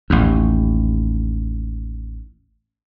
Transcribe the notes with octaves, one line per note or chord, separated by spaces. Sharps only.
A1 D#2